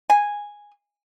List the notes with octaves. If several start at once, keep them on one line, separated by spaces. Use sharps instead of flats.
G#5